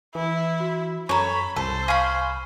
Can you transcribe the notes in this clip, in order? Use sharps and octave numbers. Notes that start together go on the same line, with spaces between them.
E3 E4
F#4
F#2 A4 C#5 G#5 A#5 B5
C2 A4 C5
G#4 F5 B5 C#6 F6